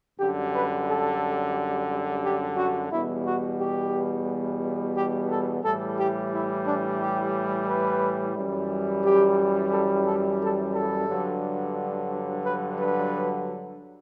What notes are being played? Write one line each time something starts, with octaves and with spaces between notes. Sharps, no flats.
F#2 D3 G3 G4
B4
A4
G4
F#4
E2 B2 G3 E4
F#4
G4
G4
A4
A2 E3 G3 A4
G4
E4
D4
G4
B4
F#2 E3 G3
G4
A4
A4
A4
A4
G2 D3 F#3
B4
B4